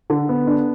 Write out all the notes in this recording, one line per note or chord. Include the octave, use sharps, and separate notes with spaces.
D3
B3
D4